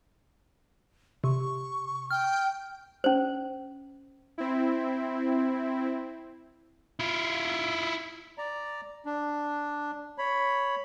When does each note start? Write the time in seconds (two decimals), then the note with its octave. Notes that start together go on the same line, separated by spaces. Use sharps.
1.24 C3 C#6
2.11 G5 F6
3.04 C#4 C5
4.38 C4 E4
7.00 E4 F4
8.38 D5 A#5
9.06 D4
10.18 C#5 B5